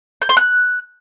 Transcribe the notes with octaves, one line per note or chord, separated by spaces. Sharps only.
G6
C6
F#6